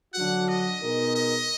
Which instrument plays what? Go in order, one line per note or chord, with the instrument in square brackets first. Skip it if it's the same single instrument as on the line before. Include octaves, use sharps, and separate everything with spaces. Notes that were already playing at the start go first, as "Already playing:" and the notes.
[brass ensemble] D3 F#3 D4 F#4 [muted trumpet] F#5
[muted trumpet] D#5
[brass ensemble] B2 G#3 D#4 A#4
[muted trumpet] D#5